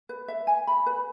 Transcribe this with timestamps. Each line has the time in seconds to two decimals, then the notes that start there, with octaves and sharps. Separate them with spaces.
0.09 B4
0.28 E5
0.47 G#5
0.67 B5
0.86 B4